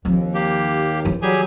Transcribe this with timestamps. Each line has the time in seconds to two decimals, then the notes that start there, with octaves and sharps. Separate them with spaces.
0.05 D#2 F3 C4
0.34 A#3 G4
1.05 E3
1.22 F#3 G3 G4 G#4 G#5